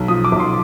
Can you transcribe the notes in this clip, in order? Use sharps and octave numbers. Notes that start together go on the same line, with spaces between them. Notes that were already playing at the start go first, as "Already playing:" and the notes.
Already playing: B1
F3 D#6
D6
B1
C6